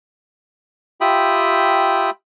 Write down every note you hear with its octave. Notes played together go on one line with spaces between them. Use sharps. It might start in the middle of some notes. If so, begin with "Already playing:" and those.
F4 G4 E5 G5 B5 D#6